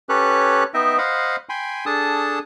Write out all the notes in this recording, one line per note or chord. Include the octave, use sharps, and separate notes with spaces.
C#4 G4 A4 B4 C#5 F#6
B3 D#4 D#5 E5 G5
C5 D#5 F5 F#5 B5
G5 G#5 B5 C6
D4 G#4 A4 A5 D#6